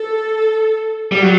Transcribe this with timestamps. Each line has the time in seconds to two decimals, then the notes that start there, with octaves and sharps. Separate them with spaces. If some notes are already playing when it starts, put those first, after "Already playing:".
Already playing: A4
1.12 G3
1.22 F#3